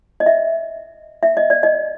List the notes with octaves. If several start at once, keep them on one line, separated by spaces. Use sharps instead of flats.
D#5
E5
E5
D#5
D5
D#5